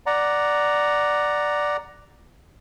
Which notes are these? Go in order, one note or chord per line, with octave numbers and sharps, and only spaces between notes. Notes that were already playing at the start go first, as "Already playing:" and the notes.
D5 F#5 A#5